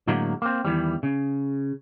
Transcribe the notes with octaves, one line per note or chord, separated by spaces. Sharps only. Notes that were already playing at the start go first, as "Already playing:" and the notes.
A2 D3 F#3 G#3 A#3
A#3 C4
E2 D#3 E3 G3
C#3